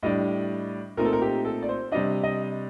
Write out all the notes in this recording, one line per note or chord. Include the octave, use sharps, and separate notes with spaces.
A2 G3 D4 D#5
A#2 A3 C4 D#4 A#4
A4
A#4
G4
A4
D5
C5
C3 G3 D4 D#5
D#5